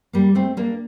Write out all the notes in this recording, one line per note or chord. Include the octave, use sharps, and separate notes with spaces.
G3 A#3
A3 C4
A#3 D4